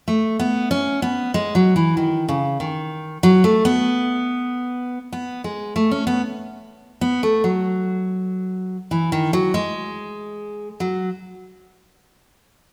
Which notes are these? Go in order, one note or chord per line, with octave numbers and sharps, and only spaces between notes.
A3
B3
C#4
B3
G#3
F#3
E3
D#3
C#3
D#3
F#3
A3
B3
B3
G#3
A3
C#4
B3
B3
A3
F#3
E3
D#3
F#3
G#3
F#3